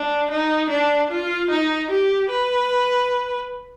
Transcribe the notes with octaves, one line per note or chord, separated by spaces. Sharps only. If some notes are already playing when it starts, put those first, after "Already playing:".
Already playing: D4
D#4
D4
F4
D#4
G4
B4